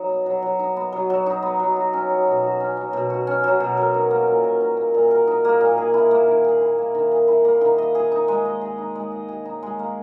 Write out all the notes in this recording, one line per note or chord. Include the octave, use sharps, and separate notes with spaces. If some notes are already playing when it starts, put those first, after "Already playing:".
Already playing: F#3 D#4
B3
F#3
F#3
D#4
B3
F#3
F#3
D#4
B3
F#3
F#4
C#4
F#3
B2
F#4
C#4
F#3
B2
F#4
C#4
F#3
B2
A#4
D#4
A#3
A#2
A#4
D#4
A#3
A#2
A#4
D#4
A#3
A#2
G#4
E4
A#3
D#3
G#4
E4
A#3
D#3
G#4
E4
A#3
D#3
D#5
G#4
D#4
G#3
D#5
G#4
D#4
G#3
D#5
G#4
D#4
G#3
A#3